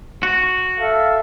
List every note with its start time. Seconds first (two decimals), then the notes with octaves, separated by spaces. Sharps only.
0.23 F#4
0.77 A4 E5 F5